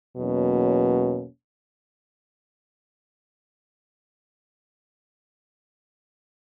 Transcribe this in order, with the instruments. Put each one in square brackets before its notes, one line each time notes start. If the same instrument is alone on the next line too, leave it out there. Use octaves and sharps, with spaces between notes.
[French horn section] E2 B2 F#3 A#3 C#4